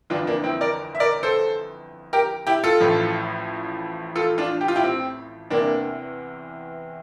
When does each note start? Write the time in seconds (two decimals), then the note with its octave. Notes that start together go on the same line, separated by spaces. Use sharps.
0.10 G1 F2 E3 D4 F4
0.27 A#3 D4
0.44 C4 E4
0.61 A#4 D5
0.95 E5
1.00 A#4 D5
1.23 A4 C5
2.13 G4 A#4
2.47 E4 G4
2.64 F4 A4
2.80 A1 A2 F3
4.16 F4 A4
4.38 D4 F4
4.61 G4
4.68 F4
4.76 E4 G4
4.84 C4
5.50 E2 C3 E3 A#3 D4